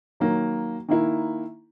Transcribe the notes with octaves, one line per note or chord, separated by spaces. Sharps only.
D#3 F#3 A#3
D#3 A#3 E4